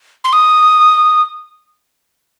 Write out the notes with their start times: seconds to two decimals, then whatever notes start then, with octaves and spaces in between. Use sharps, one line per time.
0.24 C6
0.33 D#6